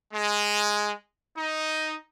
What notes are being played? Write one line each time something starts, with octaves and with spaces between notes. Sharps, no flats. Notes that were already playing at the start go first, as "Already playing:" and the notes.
G#3
D#4